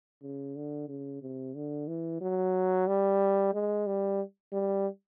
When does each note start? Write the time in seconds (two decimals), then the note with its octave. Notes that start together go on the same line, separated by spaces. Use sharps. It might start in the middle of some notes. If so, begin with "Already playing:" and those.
0.23 C#3
0.56 D3
0.89 C#3
1.22 C3
1.55 D3
1.88 E3
2.21 F#3
2.88 G3
3.54 G#3
3.87 G3
4.53 G3